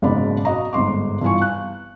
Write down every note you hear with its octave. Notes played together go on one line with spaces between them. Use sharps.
F#1 G#2 B2 D5 B5
F#4 D#5 A#5
G1 G#2 C6 D6
G2 E3 B3 F4 G#5 C#6
F#6